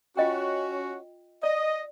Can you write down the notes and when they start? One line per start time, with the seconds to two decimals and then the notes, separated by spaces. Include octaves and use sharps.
0.17 C#4 F4 F#4 D#5 G5
1.43 D5 D#5